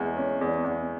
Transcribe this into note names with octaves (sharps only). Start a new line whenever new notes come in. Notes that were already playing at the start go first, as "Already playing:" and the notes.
Already playing: E2 G#3
C#4
E2
E2